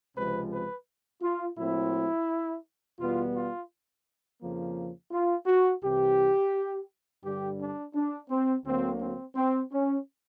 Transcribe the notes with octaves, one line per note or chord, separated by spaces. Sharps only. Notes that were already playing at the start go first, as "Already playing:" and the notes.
C#2 C3 F3 G#3 C4 B4
B4
F4
A#2 F#3 A3 C4 E4
E2 B2 G3 B3 F4
F4
F2 C#3 F3 A#3
F4
F#4
C2 C3 E3 G4
G2 D3 G3 G4
D4
D4
C4
D2 D3 F#3 A#3 C4
C4
C4
C#4